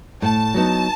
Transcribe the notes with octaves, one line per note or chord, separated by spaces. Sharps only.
A2 A5
F#3 B3 D#4